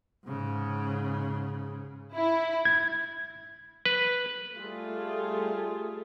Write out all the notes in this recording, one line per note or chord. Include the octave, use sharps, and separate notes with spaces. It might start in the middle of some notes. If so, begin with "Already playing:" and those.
G#2 C#3
E4
G#6
B4
G3 A3 F4 G#4 A4